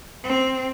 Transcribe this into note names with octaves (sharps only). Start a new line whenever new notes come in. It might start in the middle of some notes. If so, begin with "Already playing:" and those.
C4